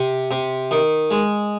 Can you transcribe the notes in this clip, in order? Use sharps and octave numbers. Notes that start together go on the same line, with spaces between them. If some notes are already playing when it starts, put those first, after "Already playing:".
Already playing: C3
C3
D#3
G#3